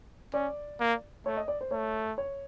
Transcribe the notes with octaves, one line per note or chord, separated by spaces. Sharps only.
C#4 D5
A#3
A3 C#5
D#5
D5
C5
A3 C#5
C#5